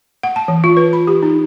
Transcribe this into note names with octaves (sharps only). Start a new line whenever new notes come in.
F#5
A5
E3
F4
B4
B5
G4
D#4